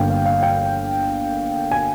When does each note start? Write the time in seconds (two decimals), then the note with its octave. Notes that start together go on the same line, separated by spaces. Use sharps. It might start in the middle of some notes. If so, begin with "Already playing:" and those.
Already playing: G1 G2 G3 A#3 F5 G5
0.10 F5
0.25 F5
0.43 G5
1.71 G#5